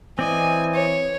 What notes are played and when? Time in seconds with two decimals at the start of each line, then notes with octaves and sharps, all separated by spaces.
0.19 E3 C4 D5 D#5 G#5
0.74 C#5